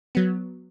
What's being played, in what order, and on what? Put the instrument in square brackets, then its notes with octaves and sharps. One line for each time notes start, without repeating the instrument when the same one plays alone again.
[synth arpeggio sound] F#3 B3